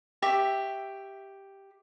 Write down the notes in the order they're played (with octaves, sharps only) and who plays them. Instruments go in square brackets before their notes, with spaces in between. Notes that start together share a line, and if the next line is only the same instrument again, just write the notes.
[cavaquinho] G4 E5 C#6